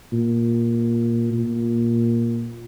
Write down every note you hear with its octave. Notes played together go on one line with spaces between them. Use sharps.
A#2
A#2